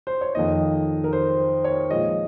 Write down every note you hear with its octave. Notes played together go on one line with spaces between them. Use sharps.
C5
C#5
F2 D#3 A#3 D#5
A#4
C5
C#5
A#2 F3 G#3 D#5